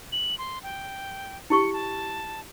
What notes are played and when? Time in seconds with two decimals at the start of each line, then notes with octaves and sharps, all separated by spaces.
0.12 F#7
0.38 C6
0.63 G5
1.50 E4 G4 C#6 C#7
1.73 A5